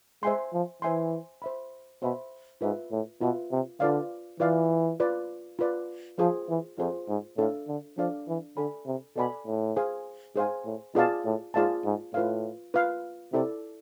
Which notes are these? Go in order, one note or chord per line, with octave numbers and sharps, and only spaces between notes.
G#3 C5 E5 G#5 C6
F3
E3 C5 E5 G#5 C6
C5 E5 B5
B2 C5 E5 B5
G#2 F4 B4 E5
A2
B2 F4 B4 E5
C3
D3 F4 B4 D5 F5
E3 F4 B4 D5 F5
F4 B4 D5
F4 B4 D5
F3 F4 G#4 C5
E3
F2 F4 G#4 C5
G#2
A2 D4 A4 D5 F5
D3
F3 D4 A4 D5 F5
E3
D3 A4 D5 G#5 B5
C3
B2 A4 D5 G#5 B5
A2
G#4 C5 F5 G#5
G#2 G#4 C5 F5 G#5
A2
B2 F4 G#4 D5 F5 A5
A2
G#2 F4 G#4 D5 F5 A5
G#2
A2 F4 B4 F5
F4 B4 F5
C3 E4 A4 D5